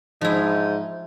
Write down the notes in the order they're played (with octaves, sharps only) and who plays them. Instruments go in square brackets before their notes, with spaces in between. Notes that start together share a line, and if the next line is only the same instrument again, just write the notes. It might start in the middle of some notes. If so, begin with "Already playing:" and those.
[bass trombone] G#2 [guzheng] F3 E4 [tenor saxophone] D#4